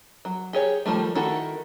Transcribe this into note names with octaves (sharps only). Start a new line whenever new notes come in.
F#3
G4 G#4 C#5
D#3 F3 G3 A3
D#3 E4 F#4 A4